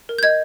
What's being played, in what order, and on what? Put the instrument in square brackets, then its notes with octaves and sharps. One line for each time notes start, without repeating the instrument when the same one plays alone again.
[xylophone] A#4
G6
D#5 G#6